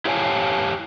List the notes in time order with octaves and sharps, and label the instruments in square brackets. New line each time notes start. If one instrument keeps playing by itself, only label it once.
[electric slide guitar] E4 G4 C#5 F5 G#5 A5